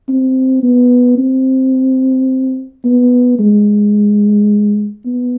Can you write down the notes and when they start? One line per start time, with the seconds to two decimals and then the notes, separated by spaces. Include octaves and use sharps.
0.09 C4
0.63 B3
1.18 C4
2.85 B3
3.39 G#3
5.05 B3